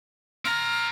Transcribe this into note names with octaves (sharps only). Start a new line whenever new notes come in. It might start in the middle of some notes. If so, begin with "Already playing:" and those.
C4 A#5 F6